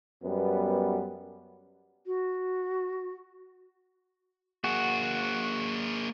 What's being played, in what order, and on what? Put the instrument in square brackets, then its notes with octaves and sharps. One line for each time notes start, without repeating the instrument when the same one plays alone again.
[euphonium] F#2 [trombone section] G3 B3
[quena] F#4
[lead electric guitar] A#3 G#4 [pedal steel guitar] F#4